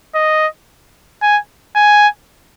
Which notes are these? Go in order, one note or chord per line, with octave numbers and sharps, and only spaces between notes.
D#5
G#5
G#5